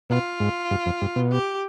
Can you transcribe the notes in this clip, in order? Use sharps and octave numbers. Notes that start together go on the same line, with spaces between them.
B2 F4
G#2
G2
F2
G2
B2
G4